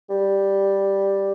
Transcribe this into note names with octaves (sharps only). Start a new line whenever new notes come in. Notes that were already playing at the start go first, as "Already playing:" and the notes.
G3